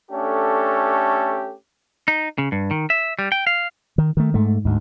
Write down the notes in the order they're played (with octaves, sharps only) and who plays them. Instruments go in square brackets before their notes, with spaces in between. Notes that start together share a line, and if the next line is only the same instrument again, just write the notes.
[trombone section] A3 C#4 D4 G4 A4
[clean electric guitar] D#4
C#3
G2
D#3
E5
G3
G5
F5
[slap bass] D#3
D#3 A3
G#2 A3
D2 G#2